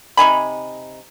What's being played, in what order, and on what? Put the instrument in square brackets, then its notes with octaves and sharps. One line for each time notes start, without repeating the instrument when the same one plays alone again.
[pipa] C3 D#4 G#5 B5